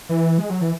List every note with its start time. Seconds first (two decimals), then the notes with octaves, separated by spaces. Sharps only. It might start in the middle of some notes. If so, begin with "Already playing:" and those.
0.09 E3
0.38 G#3
0.50 F#3
0.61 E3